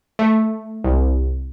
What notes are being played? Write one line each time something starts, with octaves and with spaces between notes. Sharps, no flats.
A3
C2